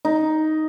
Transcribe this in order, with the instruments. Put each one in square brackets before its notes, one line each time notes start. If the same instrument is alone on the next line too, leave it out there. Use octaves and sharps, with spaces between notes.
[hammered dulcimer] D#4